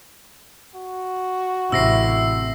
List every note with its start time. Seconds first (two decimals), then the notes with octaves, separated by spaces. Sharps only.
0.76 F#4
1.72 A1 C3 E4 E6 A#6 C7